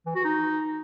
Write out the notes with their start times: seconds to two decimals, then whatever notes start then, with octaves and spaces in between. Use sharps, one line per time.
0.06 E3
0.15 F#4
0.25 D#4